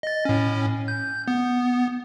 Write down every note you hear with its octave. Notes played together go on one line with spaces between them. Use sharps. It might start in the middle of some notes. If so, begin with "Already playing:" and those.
D#5 A6
A2 C#4
G6
B3